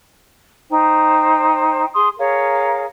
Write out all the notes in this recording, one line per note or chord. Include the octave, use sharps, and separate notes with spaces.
D#4 C5 G5
G#4 C6 D#6
G#4 A#4 C#5 F5